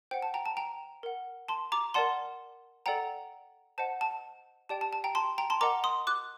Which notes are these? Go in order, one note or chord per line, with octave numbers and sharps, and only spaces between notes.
C5 F#5 G5
A5
G5 A#5
A5
G5 A#5
A#4 F#5
A5 C6
A#5 D6
A#4 D5 F#5 A5 C6
A4 D5 F#5 G5 A#5
C5 D#5 F#5 A5
A5
G4 D5 G5 A5
A5
A5
G5 A#5
A5 C6
G5 A#5
A5 C6
A#4 D#5 F#5 A#5 D6
C6 D#6
D6 F#6